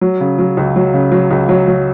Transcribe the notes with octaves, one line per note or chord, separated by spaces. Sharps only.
F#3
C#3
F#3
C#2
F#3
C#3
F#3
C#2
F#3
F#3